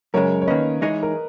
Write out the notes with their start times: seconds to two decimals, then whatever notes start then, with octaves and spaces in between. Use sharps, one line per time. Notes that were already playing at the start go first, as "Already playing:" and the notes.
0.14 F#2 C#3 G#3 A#4 C#5
0.42 C#5
0.47 D#3 A#3 C#4 B4 D#5
0.81 E3 G#3 D#4 G#4 C#5
1.03 A#4